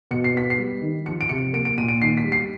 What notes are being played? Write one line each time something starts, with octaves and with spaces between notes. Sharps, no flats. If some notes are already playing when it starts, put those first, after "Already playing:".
B2 C#7
C7
B3 B6
C7
G3
D#3
F3 C#7
D7
C3 C#7
A#3 D7
D7
A#2 D#7
D7
D#3 C7
B6
G3
C7